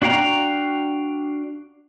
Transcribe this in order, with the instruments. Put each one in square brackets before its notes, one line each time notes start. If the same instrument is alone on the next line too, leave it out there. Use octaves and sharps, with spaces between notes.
[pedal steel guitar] D4 F#4 F5 G5 A#5